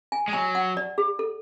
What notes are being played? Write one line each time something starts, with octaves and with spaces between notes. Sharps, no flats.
G#5
G#3
F#3 G#5
F#5
D5
G#4
A4